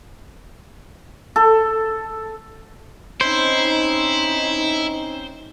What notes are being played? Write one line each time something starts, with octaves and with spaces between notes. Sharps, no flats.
A4
C4 C#4 D#4 E4 C5